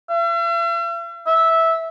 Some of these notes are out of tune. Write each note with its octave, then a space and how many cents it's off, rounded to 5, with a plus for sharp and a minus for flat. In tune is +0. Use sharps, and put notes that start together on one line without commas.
E5 +45
E5 -10